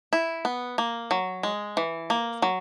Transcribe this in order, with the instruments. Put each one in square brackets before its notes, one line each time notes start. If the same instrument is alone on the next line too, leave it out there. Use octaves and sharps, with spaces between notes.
[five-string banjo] E4
B3
A#3
F#3
G#3
E3
A#3
F#3